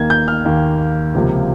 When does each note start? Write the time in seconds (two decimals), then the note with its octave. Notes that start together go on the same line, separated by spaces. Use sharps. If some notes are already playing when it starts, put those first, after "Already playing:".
Already playing: D#2 D#3 A#3 G#6
0.10 G6
0.28 F6
0.45 D#2 D#3 A#3
1.15 C#2 C3 F3 A#3